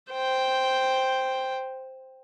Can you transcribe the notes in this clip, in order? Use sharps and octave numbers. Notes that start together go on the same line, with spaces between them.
C5 G5